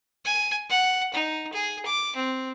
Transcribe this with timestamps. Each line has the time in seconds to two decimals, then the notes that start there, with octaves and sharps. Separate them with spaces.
0.25 G#5
0.70 F#5
1.14 D#4
1.53 G#4
1.86 D6
2.16 C4